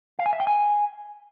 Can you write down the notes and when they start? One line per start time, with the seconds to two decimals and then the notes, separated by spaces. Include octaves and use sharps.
0.19 F5
0.26 G#5
0.33 E5
0.40 G5
0.47 G#5